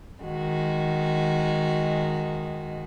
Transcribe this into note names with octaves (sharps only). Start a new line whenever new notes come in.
D#3 G#3 F#4